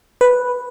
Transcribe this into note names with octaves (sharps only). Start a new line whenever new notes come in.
B4